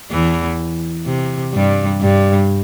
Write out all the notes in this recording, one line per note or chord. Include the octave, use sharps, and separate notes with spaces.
E2 E3
C3
G2 G3
G2 G3